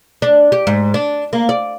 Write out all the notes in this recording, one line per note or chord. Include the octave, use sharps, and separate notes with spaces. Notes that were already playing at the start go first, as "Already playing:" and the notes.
D4
G4
G#2
D4
A#3
D5